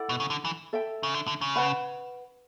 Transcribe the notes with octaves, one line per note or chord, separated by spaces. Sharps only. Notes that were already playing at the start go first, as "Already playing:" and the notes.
Already playing: E4 A4 D5 F#5
B2
C#3
D3
E3
A4 E5 G5
C#3
D3
D3
C#3
B4 F#5 B5